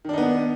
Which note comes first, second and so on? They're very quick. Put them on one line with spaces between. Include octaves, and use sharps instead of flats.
D#3 D4 D#4 B3